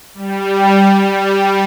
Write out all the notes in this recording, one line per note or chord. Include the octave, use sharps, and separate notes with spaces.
G3
G3
G3